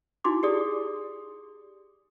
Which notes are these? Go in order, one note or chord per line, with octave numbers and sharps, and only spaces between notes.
D#4 E4 F#4 C6 D6
G4 G#4 D5 D#6